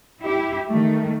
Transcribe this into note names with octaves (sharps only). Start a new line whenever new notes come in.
E4 G4
D#3 A3